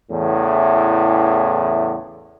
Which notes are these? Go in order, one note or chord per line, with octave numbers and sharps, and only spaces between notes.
E2 A2 C#3 E3